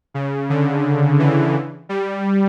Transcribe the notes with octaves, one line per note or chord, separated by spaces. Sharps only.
C#3
D3
E3
G3